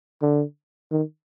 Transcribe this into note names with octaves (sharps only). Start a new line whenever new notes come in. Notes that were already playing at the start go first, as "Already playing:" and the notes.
D3
D#3